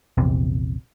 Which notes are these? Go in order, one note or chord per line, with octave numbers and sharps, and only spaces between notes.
A#1 E2 C3